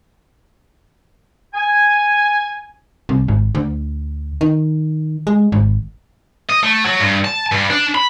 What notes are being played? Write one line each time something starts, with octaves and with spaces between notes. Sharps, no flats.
G#5
C2
G#1
D2
D#3
G#3
G#1
D#5
A3
F#3
G2
A5
G2
D4
B5